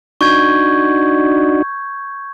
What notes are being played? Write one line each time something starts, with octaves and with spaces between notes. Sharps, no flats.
D4 D#4 F#4 C#6 G6 G#6